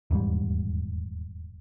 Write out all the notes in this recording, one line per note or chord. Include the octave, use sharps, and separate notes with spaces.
D#1 E2 G#2 G3